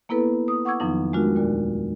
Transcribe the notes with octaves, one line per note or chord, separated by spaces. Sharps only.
A#3 B3 E4 A4 B4
D#6
F#5 C#6 D6 E6 G#6
F2 D#3 F3 F#3 B3 D#4
G#3 A3 D4 F4 F#4 A#4
D#2 A#2 A#4 D5